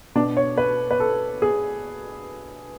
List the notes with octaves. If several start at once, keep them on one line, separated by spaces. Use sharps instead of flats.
B2 D4
C#5
B4
B4
A4
G#4